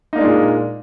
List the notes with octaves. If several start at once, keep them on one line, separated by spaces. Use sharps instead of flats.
A#2 G#3 A#3 D4 D#4